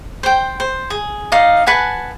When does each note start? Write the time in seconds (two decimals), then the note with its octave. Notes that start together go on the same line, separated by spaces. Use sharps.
0.23 C5 G5
0.60 C5
0.90 G#4
1.32 D#4 D5 D#5 F5
1.66 B4 F#5 G#5 A5